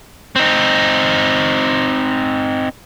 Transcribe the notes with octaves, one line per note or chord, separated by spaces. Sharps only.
C4 D#4